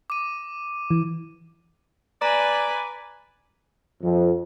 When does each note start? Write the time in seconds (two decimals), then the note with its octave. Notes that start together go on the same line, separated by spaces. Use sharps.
0.10 D6 D#7
0.90 E3
2.22 B4 D5 G#5 A#5
4.03 F2